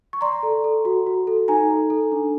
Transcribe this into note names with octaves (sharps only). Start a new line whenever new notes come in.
C#6
D5 A#5 C6
A4
A4
F#4
F#4
A4
D#4 G#5 A#5
A4
A4
D4